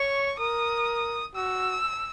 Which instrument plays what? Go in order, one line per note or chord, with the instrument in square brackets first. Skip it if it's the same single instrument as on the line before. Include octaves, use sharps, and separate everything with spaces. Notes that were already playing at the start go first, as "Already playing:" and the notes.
Already playing: [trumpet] C#5 [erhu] C#6
[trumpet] A#4 [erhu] D#6
[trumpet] F#4 [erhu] E6